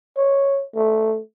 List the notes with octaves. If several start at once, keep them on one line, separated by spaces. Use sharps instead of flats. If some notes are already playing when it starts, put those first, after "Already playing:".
C#5
A3